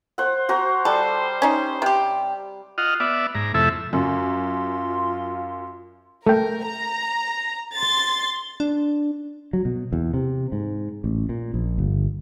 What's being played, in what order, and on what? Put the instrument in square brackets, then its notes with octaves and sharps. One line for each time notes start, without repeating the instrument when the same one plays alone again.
[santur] C5 F#5
F#4 C5 A#5
[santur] G3 [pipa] A4 [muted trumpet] C5
[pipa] C#4 D#4
C3 G4
[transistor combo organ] F4 D#5 F#5 F6
B3 D5 E5
G#2 A#5
F2 C3 A3 E4 A4 E5
[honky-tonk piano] F#2 [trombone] F4 [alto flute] C6
[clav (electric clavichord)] A3 G5 [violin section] A#4
[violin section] A#5
C6 A6
[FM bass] D4
[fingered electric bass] F#3
B2
E2
C3
G#2
A1
A#2
A#1
G1